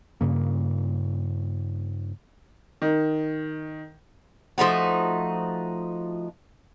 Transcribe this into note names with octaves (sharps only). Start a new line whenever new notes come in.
G2 C#3 A#3
D#3
F3 A3 D#4 F#4